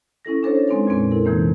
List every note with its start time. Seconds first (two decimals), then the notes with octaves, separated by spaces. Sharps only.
0.25 C#4 E4 A4 A#6
0.43 D4 A4 C5 C#5
0.68 G#3 C4 D#4 B4
0.87 F2 A#2 G#3 C4 B4
1.11 E4 A4 A#4
1.25 F2 C3 E3 A#3 D#4